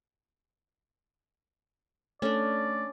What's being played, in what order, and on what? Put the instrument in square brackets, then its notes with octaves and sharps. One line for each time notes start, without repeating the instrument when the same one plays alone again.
[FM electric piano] A3 A4 [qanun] C#4 D4 [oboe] D5